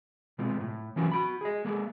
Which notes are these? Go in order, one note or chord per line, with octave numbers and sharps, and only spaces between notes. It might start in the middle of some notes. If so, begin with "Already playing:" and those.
B2 G#3 C4 F4
A2
E3 F#3 A#3 C#4 F#4
F#4 B5
G#4 D#5
G#3 A#3 G#4